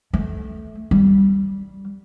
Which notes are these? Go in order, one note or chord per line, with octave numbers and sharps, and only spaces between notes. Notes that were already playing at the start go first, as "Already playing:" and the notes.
A3
G3